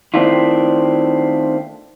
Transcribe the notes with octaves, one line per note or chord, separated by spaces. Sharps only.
D#3 A3 C4 D4 E4 F4